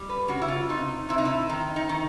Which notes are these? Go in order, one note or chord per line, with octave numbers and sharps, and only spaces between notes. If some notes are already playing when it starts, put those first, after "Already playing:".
Already playing: G3
B4
C#3 F#4
E4
F4
C3 D#4
C3 E4
D#4
E4
D#3 D#4
D#4
D#3